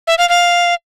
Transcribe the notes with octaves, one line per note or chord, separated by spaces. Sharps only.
E5
F5
F5